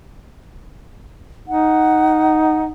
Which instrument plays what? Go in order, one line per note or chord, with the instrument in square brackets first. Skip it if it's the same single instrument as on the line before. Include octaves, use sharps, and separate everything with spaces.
[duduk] D#4 [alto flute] F#5